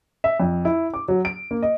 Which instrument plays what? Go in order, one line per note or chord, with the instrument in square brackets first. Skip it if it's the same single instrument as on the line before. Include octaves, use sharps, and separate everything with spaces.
[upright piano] E5
F2
E4
D6
F#3
D7
A#3
D#5